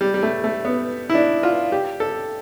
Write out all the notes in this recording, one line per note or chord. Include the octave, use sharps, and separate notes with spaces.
G3
G3
A3
A3
B3
E4
D4
F4
G4
A4